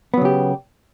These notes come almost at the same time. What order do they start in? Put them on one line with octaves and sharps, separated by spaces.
B3 F#3 C#3 G4